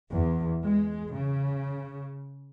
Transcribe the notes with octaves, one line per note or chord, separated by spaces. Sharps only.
E2
G#3
C#3